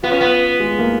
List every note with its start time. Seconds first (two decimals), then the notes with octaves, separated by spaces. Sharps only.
0.03 B3 F4
0.11 C#4
0.21 B3
0.60 G#3
0.79 A#3